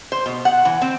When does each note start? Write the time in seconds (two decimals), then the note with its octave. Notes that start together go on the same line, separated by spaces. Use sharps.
0.12 C5
0.26 B2
0.45 F#5
0.65 E3
0.82 C4